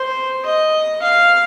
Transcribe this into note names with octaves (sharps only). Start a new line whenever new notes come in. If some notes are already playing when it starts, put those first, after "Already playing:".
Already playing: C5
D#5
F5